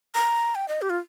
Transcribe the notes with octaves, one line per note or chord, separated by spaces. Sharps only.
A#5
G5
D#5
G4
F4